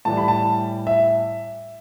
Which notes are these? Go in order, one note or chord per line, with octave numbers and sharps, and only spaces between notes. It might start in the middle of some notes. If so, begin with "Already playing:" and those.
A2 E3 G3 A5
B5
A5
E5